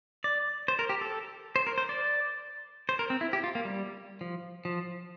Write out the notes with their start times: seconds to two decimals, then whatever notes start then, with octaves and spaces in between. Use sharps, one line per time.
0.24 D5
0.68 C5
0.79 A#4
0.89 G4
1.01 A4
1.56 C5
1.67 A#4
1.78 C5
1.89 D5
2.89 C5
2.99 A#4
3.10 C4
3.21 E4
3.33 G4
3.44 F4
3.55 A#3
3.65 G3
4.21 F3
4.65 F3